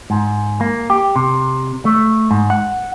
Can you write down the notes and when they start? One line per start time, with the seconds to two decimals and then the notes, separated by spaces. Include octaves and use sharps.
0.10 G#2
0.61 A#3
0.90 G4
1.16 C3
1.85 A3
2.31 G#2
2.50 F#5